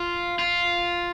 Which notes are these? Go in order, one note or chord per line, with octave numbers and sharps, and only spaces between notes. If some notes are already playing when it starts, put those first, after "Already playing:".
Already playing: F4
F4